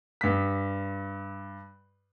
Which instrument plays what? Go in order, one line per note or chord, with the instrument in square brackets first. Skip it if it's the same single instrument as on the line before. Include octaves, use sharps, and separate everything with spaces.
[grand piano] G2 B6